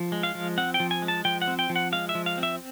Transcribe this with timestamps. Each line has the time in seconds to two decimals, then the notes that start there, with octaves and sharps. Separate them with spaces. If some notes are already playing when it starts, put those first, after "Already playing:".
Already playing: F3
0.12 G#3
0.23 F5
0.35 F3
0.58 C4 F#5
0.74 G5
0.80 F3
0.91 G#5
1.02 G#3
1.08 A5
1.25 F3 G5
1.42 F#5
1.47 C4
1.59 G5
1.70 F3
1.76 F#5
1.92 G#3 F5
2.09 E5
2.15 F3
2.26 F5
2.38 C4
2.43 E5